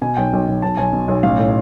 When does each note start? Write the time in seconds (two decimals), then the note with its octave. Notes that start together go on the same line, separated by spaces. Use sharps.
0.02 B2 G#5
0.17 B1 G5
0.33 B1
0.48 B1
0.62 B1 A5
0.77 B1 G#5
0.93 B2
1.08 B1
1.23 A1 F5
1.39 A2